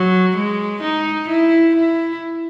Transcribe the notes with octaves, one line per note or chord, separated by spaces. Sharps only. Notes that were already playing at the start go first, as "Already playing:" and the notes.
Already playing: F#3
G#3
D#4
E4
E4